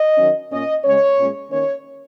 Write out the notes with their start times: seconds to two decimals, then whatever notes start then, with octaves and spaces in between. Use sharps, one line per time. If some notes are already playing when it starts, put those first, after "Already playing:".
Already playing: D#5
0.16 D#3 F#3 C#4
0.50 A#2 A#3 C#4 D#5
0.83 C#3 G#3 C#4 C#5
1.17 A#2 G#3 C#4
1.49 D#3 A#3 C#4 C#5